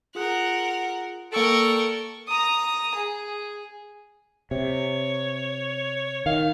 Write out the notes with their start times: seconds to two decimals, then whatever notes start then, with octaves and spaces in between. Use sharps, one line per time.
0.15 F4 G#4 A#4 F#5 F#6
1.32 A#3 A4 A#4 D5 G5 C#6 E6 D7
2.28 A#5 D#6
2.95 G#4
4.51 C3 C#5
6.26 D#3 F5